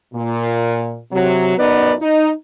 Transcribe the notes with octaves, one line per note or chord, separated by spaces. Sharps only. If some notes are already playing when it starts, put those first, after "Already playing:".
A#2
C3 F#3
F#2 B3 D#4 B4 D5
D#4